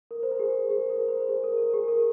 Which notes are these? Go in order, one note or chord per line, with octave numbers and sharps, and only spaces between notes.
A#4
C5
A#4
G#4
G#4
A#4
C5
G#4
A#4
A#4
G#4
A#4